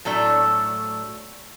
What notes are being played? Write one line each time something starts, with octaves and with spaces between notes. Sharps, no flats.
A2 F#3 A3 D4 E4